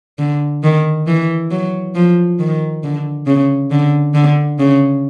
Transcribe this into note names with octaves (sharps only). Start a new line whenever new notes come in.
D3
D#3
E3
F#3
F3
D#3
D3
C#3
D3
D3
C#3